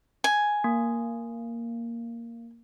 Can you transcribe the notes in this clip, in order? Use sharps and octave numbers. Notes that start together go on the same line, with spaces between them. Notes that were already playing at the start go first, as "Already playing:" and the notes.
G#5
A#3